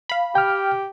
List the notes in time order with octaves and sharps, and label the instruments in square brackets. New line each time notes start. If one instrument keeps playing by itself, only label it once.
[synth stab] F5 B5
[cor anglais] G4 [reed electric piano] G5 F6